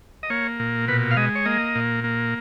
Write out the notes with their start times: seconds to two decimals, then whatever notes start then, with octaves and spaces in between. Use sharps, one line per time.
0.23 D#5
0.30 A#3 C#5
0.60 A#2
0.88 B2 B4
1.11 F5
1.17 G#3 D#5
1.35 C#5
1.45 A#3 D#5
1.75 A#2
2.04 A#3